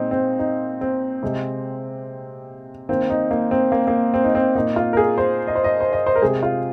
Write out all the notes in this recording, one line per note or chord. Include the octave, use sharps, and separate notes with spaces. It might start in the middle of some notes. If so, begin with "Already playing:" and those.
Already playing: A#2 G#3 C4 D#4
C4
D#4
C4
C3 G#3
D#3 A#3 C4
D#4
A#3
C4
A#3
A#3
C4
D#4
C4
A#2 A#3 D#4
F4
A#4
G#4
C5
D#5
C5
D#5
C5
D#5
C5
A#4
C3 G#3 G#4
F4